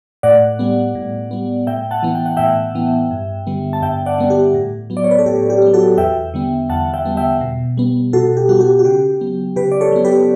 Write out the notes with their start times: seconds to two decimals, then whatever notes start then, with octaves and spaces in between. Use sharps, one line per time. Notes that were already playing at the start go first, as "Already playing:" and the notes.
0.23 A2 D5 F#5
0.59 G3 B3
0.95 A2
1.31 G3 B3
1.67 A2 E5 G5
1.91 F#5 A5
2.03 E3 B3
2.15 G5
2.26 F#5
2.37 A2 E5 G5
2.75 E3 B3
3.11 G2
3.47 D3 G3 B3
3.73 A5
3.82 G2 E5 G5
4.06 D5 F#5
4.18 D3 G3 B3
4.30 G4
4.54 A2
4.90 F#3 B3
4.97 D5
5.04 C#5
5.11 B4
5.19 A4
5.26 A2 G4
5.50 G4
5.62 F#3 B3
5.74 F#4 A4
5.98 E2 E5 G5
6.34 D3 G3 B3
6.70 E2 F#5 A5
6.94 E5 G5
7.05 D3 G3 B3
7.17 E5 G5
7.41 B2
7.77 G3 B3
8.13 B2 F#4 A4
8.37 G4
8.49 G3 B3 F#4
8.61 G4
8.79 F#4
8.84 C#3 G4
9.21 F#3 B3
9.56 C#3 G4 B4
9.72 D5
9.81 A4 C#5
9.92 F#3 B3
10.05 G4 B4